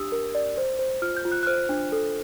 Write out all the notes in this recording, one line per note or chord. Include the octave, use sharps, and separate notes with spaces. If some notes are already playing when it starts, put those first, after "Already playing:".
Already playing: D4 G4 D#6 E6
A#4
D5
C5
C5
F4 F6
G6
F4
F#6
F#6
C5 F6
D4
A4